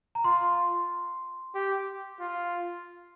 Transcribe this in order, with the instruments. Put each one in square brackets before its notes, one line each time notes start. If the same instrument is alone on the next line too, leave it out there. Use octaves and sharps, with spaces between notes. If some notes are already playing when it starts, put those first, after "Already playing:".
[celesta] A#5
[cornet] F4 [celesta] C6
[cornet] G4
F4